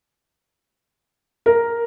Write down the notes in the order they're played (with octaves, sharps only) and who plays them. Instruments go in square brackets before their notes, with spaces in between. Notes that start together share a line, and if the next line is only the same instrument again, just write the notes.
[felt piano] A#4